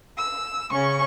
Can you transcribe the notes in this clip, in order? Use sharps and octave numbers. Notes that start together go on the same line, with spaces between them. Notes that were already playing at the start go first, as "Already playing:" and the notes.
E6
C#3 C#4 C#6